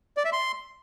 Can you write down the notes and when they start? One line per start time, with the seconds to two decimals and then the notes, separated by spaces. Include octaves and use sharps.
0.17 D5
0.25 E5
0.33 C6